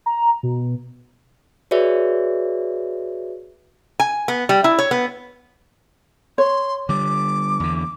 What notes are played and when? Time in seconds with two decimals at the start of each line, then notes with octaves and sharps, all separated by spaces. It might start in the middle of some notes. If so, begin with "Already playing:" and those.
0.06 A#5
0.43 B2
1.71 F#4 G#4 B4 C#5 D5 E5
4.00 G#5
4.28 B3
4.49 G3
4.64 E4
4.79 C#5
4.91 B3
6.38 C#5 C6
6.89 D3 G3 D6
7.60 E2 D3